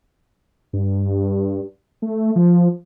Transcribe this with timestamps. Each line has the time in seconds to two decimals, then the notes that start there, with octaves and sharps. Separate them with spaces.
0.73 G2
2.02 A3
2.36 F3